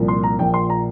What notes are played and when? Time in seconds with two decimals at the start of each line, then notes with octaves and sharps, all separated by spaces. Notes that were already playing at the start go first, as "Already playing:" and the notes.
Already playing: C2 A#2 F3
0.08 C6
0.23 A#5
0.39 A#1 A#2 F3 G5
0.54 C6
0.70 A#5